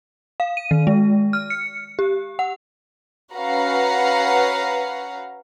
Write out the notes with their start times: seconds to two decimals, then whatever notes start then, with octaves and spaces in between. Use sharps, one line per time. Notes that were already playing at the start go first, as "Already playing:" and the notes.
0.40 F5
0.57 D#7
0.71 D#3
0.87 G#3
1.33 F6
1.50 C#7
1.99 G4
2.39 F#5
3.35 C#4 F#4 B4 F5 F#5 A#5